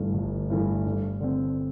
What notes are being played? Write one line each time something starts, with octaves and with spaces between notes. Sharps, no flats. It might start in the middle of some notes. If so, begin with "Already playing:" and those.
Already playing: G1 G2 E3 A3
G1
G2 E3 A3
G2
D3 C4